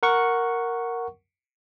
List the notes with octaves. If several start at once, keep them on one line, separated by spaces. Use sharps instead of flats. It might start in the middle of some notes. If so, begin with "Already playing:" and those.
A#4 F#5 C#6